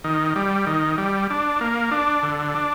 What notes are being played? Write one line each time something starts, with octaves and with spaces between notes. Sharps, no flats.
D#3
G3
D#3
G3
D4
A#3
D4
D3
D4